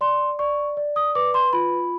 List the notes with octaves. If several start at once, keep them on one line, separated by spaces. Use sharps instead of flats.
D5 C6
D5 C#6
D5
D#6
B4 D6
C6
F4 B5